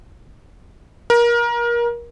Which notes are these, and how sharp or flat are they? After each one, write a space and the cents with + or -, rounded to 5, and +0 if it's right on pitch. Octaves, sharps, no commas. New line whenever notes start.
A#4 +25